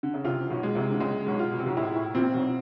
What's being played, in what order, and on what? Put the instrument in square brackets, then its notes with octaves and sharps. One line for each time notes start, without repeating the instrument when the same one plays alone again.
[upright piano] D3
C#3
[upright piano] C2 C3 [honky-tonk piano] F4
[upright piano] B1 B2
[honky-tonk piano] G#3
[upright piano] C2 C3
D3
[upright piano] C#2 C#3 [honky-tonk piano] G#3
[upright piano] B1 B2
[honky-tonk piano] F4
[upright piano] B2
C3
B1 B2
[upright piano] A2 [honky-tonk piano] E4
[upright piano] A2
[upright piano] A#1 A#2 [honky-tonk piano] C4
[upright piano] B1 B2